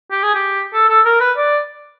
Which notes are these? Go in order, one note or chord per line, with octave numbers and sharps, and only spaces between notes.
G4
G#4
G4
A4
A4
A#4
B4
D5